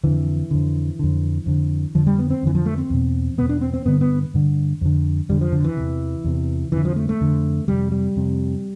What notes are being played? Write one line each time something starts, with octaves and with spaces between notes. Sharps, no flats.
F2 D3 E3
F2 D3
F2 D3
F2 D3
F2 D3 F3
G3
B3
C4
F2 D3 E3
F3
A3
C4
E2 B2
E2 B2 B3
D4
C4
C4
G2 D3 B3
B3
G2 D3
F2 D3
F2 D3 G3
F3
D3
E3
E2 C3
E2 C3
F2 D3 E3
F3
A3
A3
F2 D3
F2 C3 G3
G3
F2 C3